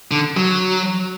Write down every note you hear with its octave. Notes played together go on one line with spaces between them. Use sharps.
D3
F#3